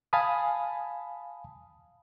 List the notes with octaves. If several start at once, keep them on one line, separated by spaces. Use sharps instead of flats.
F5 G#5 A5 B5 D#6